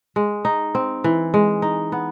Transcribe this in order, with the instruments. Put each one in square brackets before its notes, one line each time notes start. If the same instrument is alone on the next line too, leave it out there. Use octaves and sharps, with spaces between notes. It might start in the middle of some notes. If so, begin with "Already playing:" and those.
[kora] G#3
D#4
C4
E3
G#3
D#4
B3